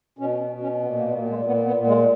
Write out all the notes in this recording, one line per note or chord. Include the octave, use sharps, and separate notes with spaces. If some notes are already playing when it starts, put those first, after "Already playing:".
B2 C#4
B2
C#4
A#2 B3
A#3
B3
A#2 A#3
G#3
A#2 B3
B3
A#2
G#3